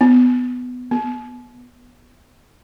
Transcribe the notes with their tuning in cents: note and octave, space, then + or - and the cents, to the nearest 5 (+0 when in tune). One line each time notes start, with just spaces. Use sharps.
B3 +15
B3 -15